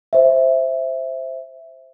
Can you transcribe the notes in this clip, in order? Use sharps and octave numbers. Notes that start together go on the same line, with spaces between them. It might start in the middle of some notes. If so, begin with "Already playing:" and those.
C5 E5